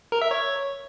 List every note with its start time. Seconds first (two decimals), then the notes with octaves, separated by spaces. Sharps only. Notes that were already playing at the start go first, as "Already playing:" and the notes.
0.12 A#4
0.22 E5
0.31 C#5